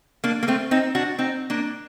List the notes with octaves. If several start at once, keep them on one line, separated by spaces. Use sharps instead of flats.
A#3 D4
A#3
A3 C4
C4 D#4
D4 F#4
C4 D#4
A#3 D4